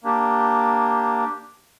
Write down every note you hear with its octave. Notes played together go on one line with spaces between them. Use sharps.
A#3 D4 G4